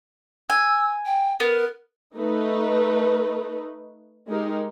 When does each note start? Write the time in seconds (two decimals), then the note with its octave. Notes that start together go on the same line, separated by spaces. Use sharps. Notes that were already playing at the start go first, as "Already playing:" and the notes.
0.50 G#5 E6
1.05 G5
1.40 B3 A#4
2.16 A3 D#4 B4
4.28 G#3 D#4 G4 A#4